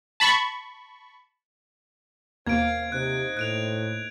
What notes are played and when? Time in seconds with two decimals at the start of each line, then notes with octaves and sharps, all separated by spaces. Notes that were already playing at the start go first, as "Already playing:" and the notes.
0.20 A5 B5 C#6
2.47 D#2 B2 A#3 C5 F5 G#6 D7
2.92 C3 D#4 C5 F#6
3.37 A2 F#6 D7 F7